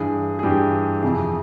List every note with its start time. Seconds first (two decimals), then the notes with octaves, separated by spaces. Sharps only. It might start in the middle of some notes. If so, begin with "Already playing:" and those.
Already playing: G2 E3 G#4
0.39 G#4
0.43 G2 E3 G4
1.03 F2 C3 E3 G#4